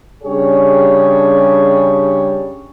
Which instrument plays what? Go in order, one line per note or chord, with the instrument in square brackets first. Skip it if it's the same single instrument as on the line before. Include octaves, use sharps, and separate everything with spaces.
[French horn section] C#3 G3 D4 G4 G#4 C#5